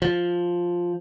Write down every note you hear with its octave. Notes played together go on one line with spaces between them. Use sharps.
F3